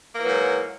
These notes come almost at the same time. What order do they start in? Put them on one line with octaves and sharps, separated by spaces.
A#3 E3 F#3 G#2